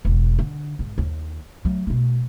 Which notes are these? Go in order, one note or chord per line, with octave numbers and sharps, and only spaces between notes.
E1 D2
D3
G#1
D#2
F#3 A3
B2 A3